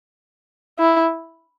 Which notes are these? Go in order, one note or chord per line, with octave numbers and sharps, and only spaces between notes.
E4